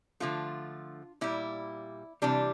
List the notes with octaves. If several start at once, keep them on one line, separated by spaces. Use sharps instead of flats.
D3 F3 A3 F4
A#2 G3 E4
C3 E3 G3 D4